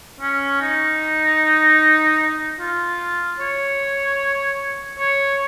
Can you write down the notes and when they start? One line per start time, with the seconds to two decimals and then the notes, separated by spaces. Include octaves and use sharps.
0.21 C#4
0.61 D#4
2.60 F4
3.39 C#5
4.99 C#5